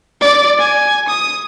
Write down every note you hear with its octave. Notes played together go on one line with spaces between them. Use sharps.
D5
G#5
D#6